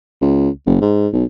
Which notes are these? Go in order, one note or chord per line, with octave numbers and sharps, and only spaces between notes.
C#2
F#1
G#2
B1